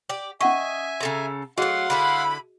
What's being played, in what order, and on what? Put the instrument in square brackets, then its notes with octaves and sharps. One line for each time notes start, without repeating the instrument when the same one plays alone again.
[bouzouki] G4 D5
[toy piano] C#4 F#5 C#6 [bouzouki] D#5 [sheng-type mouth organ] E5 G#5
[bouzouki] C#3 A4 A#5
[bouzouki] F#3 A3 [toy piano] F#4 G#4 D#5 [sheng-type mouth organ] F5 F#5 C6
[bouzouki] D3 E4 A4 [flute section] B5